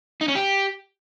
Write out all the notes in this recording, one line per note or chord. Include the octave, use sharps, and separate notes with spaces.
D#4
C#4
G4